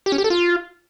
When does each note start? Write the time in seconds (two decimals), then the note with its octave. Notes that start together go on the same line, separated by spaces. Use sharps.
0.06 G4
0.12 C#4
0.18 G4
0.24 A4
0.30 F4